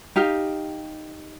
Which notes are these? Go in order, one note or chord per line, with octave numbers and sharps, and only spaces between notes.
D#4 G4 F5 G5